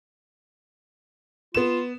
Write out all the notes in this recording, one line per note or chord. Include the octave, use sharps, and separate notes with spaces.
B3 F4 E7